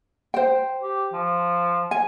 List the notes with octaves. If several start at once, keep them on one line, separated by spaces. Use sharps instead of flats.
C5 G5
G4
F3
G#5